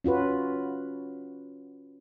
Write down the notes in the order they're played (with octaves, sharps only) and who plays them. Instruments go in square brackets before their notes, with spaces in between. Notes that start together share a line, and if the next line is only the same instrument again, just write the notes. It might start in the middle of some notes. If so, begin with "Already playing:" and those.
[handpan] C#4 F4 F#4 B4